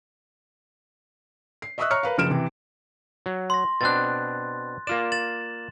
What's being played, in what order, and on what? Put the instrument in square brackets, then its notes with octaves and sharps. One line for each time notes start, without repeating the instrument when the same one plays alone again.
[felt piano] C7
D#5 E5 C#6 D#6 E6 F#6
C#5 A#5 C#6 F6 C#7
A#4 B4 F5
F#1 F3 F6 D7 E7
C3 E3
[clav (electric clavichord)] F#3
[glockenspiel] C6 A#6
[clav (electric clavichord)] B2 C4 D4 [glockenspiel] F#6 A6
[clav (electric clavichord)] A#3 F4 D5 [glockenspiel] E7
[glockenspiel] A6 E7 F#7